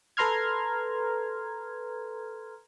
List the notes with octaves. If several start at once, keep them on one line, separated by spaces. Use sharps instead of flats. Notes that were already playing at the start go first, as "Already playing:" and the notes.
A4 B4 A#5 C6 F6 G#6